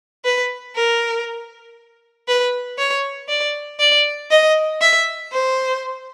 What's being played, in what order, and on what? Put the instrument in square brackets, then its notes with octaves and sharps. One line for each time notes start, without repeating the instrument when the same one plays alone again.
[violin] B4
A#4
B4
C#5
D5
D5
D#5
E5
C5